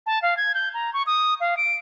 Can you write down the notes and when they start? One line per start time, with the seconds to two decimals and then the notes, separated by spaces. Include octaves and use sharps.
0.06 A5
0.22 F5
0.37 G#6
0.54 G6
0.74 A#5
0.93 C#6
1.07 D#6
1.40 F5
1.57 D7